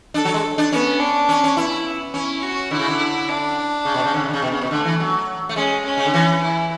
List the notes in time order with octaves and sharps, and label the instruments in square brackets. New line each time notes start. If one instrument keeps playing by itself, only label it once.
[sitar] D4 [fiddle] A4
[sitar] F#3
G#3
D4
[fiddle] B3 [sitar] C#4
[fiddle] D4
[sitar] C#4
C#4
[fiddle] B3 [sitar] E4
[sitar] C#4 [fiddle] E4
[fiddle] F#4
[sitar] D3 [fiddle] E4
[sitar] C#3
D3
[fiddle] D4
[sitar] C#3
B2
C#3
[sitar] D3 [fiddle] C#4
[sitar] C#3
D3
C#3
[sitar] B2 [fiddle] B3
[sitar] C#3
B2
[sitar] D3 [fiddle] A3
[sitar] E3
F#3
A3
[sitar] G#3 [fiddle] C#4
[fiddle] C#4
[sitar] C#3
D3
E3
[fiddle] E4